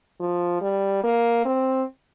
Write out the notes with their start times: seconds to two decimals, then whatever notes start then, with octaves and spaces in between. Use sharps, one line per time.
0.20 F3
0.62 G3
1.04 A#3
1.45 C4